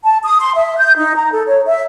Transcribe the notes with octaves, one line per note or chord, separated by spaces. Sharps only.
A5
D#6
C6
E5
G6
D#4
A#5
A4
C#5
E5